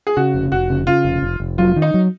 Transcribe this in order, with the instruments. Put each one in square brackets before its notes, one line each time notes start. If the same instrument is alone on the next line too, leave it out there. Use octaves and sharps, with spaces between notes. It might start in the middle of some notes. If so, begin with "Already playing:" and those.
[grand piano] G#4
[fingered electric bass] C#3 [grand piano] F#4
[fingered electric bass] F1
[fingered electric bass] F1 [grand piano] F#4
[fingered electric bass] C#3
[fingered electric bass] C#3 [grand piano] F4
[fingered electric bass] F1
F1
F1
[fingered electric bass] F#3 [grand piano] F4
[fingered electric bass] D#3
[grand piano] D#4
[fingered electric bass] F#3